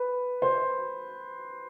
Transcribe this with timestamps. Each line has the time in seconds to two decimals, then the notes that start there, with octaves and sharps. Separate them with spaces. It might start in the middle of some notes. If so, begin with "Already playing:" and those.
Already playing: B4
0.42 C5